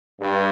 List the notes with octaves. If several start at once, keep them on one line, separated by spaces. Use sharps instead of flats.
G2